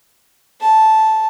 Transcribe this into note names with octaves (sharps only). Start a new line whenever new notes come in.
A5